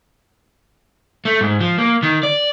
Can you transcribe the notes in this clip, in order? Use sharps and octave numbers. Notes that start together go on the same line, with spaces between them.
A3
G#2
F3
A#3
D#3
D5